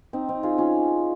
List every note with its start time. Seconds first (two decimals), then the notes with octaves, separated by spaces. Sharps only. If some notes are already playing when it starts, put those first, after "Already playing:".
0.13 C4 D#4
0.29 C4 D#4
0.43 F4 G#4
0.58 C#4 F4